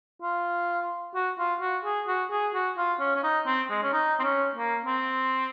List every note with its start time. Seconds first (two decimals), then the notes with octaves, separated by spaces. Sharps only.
0.22 F4
1.15 F#4
1.39 F4
1.61 F#4
1.85 G#4
2.07 F#4
2.31 G#4
2.54 F#4
2.77 F4
3.00 C#4
3.16 C#4
3.23 D#4
3.46 C4
3.70 G#3
3.83 C#4
3.92 D#4
4.19 C4
4.23 C#4
4.55 A#3
4.85 C4